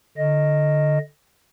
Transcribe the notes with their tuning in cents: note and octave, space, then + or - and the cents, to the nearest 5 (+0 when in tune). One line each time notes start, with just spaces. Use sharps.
D3 +0 D#5 +0